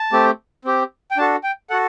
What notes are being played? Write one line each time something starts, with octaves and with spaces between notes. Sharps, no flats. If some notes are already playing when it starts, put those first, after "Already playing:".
Already playing: A5
A3 C4 G4
C4 G4
G5
D4 F#4 A4 A5
G5
F#4 A4 F#5